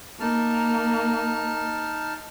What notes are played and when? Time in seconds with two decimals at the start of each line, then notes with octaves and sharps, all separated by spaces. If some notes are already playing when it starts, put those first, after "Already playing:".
0.20 A#3 D#4 A5 F6